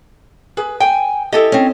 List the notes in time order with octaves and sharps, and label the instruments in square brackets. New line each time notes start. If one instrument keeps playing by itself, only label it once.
[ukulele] G#4 [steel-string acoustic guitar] B4
[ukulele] G5 [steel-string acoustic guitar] G#5
[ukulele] E4 A4 D#5 [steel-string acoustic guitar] G4
[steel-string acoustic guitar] C4 C#4